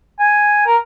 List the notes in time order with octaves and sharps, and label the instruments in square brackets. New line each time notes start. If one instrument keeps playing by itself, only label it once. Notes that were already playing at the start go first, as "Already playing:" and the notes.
[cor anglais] G#5
A#4